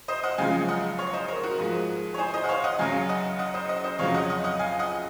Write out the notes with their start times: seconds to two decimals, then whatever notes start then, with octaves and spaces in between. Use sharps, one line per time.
0.08 C5 D#5
0.23 D#5 F#5
0.38 F#2 C#3 F3 G#3 F5 G#5
0.68 D#5 F#5
0.98 C#5 F5
1.13 C5 D#5
1.28 A#4 C#5
1.43 F#4 A#4
1.58 G#2 F3 G#3
2.14 C#5
2.18 G#4 C5
2.34 C5 D#5
2.44 F#5
2.49 C#5 F5
2.64 D#5 F#5
2.79 F#2 C#3 F#3 F5 G#5
3.09 D#5 F#5
3.39 D#5 F#5
3.54 C5 D#5
3.69 D#5 F#5
3.84 C5 D#5
3.99 F2 C#3 F#3 C#5 F5
4.14 D#5 F#5
4.29 D#5 F#5
4.44 D#5 F#5
4.59 F5 G#5
4.79 D#5 F#5